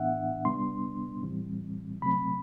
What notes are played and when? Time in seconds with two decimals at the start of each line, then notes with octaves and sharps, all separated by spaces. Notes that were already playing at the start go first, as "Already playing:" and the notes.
Already playing: A2 E3 B3 D4 E5 F#5
0.45 C3 G3 B3 D4 C6
1.23 A2 E3 G3 C4
2.02 C3 F#3 A3 C4 B5